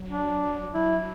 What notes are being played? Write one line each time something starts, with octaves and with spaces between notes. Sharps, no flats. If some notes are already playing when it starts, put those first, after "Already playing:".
Already playing: F#3
D4
F#3 E4